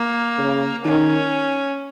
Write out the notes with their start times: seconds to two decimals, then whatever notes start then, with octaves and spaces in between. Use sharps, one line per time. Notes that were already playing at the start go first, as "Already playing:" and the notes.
Already playing: A#3
0.38 C#3
0.85 D#3 C#4